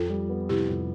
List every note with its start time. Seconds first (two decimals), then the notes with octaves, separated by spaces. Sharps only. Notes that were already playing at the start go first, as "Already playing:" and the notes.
Already playing: F2 F4 A4
0.10 G3
0.29 B3
0.49 C3 E4 G4
0.69 F2